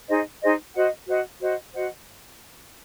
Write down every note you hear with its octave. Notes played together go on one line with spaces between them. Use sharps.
D#4 G#4 C5 D#5
D#4 G#4 C5 D#5
F#4 C5 D#5 F#5
F#4 C5 D#5 F#5
F#4 C5 D#5 F#5
F#4 C5 D#5 F#5